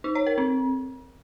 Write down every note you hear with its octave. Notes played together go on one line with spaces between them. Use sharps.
D#4
C#5
A#4
C4